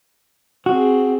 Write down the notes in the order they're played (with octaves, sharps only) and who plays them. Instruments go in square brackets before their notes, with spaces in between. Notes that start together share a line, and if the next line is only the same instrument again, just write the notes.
[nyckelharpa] C4 G#4 [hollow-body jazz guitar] F#4